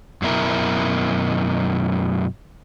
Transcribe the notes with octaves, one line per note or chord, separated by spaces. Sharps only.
F#2 B2 E4 A#4